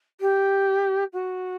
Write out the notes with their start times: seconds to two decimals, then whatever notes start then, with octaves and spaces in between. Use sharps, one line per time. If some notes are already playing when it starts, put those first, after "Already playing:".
0.21 G4
1.13 F#4